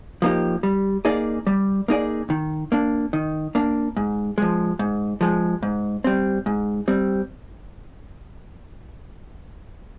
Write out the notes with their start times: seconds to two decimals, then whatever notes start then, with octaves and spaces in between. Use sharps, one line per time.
0.22 F3 A#3 D#4 G4
0.63 G3
1.05 A#3 D#4 G#4 D5
1.47 G3
1.88 A#3 D#4 G#4 D5
2.30 D#3
2.72 A#3 D4
3.13 D#3
3.55 A#3 D4
3.97 G#2
4.38 F3 G#3
4.79 G#2
5.21 F3 G#3
5.63 G#2
6.04 G3 C4
6.46 G#2
6.88 G3 C4